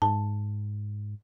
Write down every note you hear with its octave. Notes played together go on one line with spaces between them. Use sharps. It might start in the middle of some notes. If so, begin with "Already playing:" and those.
G#2 A5